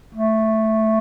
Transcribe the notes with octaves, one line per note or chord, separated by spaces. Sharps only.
A3